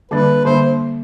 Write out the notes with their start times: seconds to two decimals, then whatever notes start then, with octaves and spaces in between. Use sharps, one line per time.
0.11 D3 G3 A#3 D4 B4
0.45 D3 G3 A#3 D4 C5